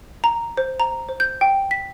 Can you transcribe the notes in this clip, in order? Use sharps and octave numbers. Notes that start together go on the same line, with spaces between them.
A#5
C5
A#5
C5
G6
G5
B6